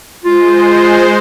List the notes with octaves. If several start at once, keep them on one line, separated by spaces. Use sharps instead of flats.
G#3 F4 C5